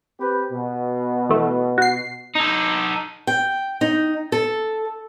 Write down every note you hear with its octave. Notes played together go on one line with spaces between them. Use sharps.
C4 G4 B4
B2
E3 A3
F#4 C7
D#4 A4
G5
D#4
A4